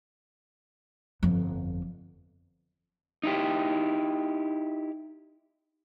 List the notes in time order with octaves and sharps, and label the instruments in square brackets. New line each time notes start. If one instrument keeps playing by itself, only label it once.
[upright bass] G1 F2
[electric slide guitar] D#4 E4 G4